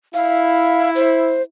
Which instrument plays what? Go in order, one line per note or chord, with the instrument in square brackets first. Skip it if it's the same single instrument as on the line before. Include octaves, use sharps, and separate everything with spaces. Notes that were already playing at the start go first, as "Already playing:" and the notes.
[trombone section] E4 [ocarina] F5
[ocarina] C5